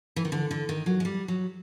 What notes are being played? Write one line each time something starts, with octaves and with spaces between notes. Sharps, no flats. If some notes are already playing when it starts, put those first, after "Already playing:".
E3
D#3
D3
D3
D#3
F#3
G#3
G3
F#3